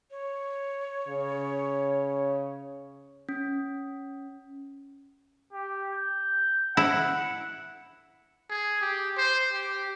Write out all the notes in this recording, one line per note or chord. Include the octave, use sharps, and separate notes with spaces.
C#5
C#3
C#4
G4
G6
E4 F#5
G#4
G4
C5
G4